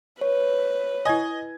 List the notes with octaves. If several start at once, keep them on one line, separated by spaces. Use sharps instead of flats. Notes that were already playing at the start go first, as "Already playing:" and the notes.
B4 C#5
E4 D#5 G#5 G#6